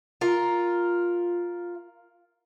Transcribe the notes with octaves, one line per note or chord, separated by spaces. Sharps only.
F4 A#4